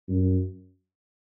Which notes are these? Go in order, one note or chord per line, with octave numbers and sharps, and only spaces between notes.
F#2